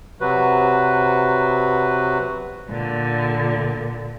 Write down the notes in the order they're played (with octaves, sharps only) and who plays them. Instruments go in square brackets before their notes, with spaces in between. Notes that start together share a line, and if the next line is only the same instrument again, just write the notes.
[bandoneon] C3 F#3 F#4 B4
[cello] A#2 D3